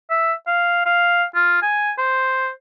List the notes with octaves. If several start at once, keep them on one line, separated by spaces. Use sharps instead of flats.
E5
F5
F5
F4
G#5
C5